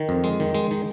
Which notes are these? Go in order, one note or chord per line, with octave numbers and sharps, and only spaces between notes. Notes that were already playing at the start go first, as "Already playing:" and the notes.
Already playing: D#3
F2
G#3
D#3
G#3
D#3